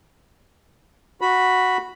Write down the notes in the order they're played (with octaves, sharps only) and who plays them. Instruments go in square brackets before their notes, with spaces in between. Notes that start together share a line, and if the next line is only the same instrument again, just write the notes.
[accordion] F#4 B5